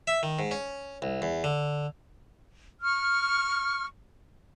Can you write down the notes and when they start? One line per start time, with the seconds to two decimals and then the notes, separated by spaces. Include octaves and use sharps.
0.07 E5
0.23 D#3
0.39 G#2
0.51 C#4
1.02 C2
1.22 E2
1.44 D3
2.81 C#6 F6